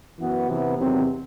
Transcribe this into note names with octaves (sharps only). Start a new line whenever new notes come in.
F#2 E3 B3 F#4
C3 E3 B3
E2 C3 D#3 F#3 C4